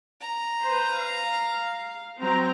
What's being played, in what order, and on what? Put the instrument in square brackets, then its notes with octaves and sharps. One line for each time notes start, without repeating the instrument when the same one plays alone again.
[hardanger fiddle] A#5
[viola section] B4 C5
F5
F#3 C4 A#5